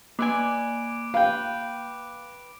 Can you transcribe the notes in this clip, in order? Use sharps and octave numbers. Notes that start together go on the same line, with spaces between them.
A#3 B4 D5 G#5 D6 D7
B4 F5 G5